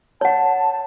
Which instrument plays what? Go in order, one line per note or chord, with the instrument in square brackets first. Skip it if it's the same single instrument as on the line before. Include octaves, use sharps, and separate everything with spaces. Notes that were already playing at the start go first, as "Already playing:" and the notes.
[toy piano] C#5 F#5 [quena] A5